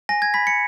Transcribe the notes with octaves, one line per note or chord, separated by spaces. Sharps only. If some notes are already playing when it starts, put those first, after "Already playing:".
G#5 A#6
G#6
B5 B6
C#7